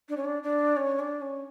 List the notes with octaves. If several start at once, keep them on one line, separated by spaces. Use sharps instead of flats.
D4
C#4
D4
D4
C#4
D4
C#4